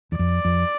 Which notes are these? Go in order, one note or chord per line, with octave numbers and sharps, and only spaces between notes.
E2
F2 D5
F2